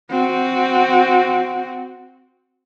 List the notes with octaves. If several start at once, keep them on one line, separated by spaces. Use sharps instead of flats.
C4 F#4